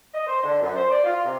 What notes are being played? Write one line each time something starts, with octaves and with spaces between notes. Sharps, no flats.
D#5
C5
D3
F#2
C5
D5
F4
C3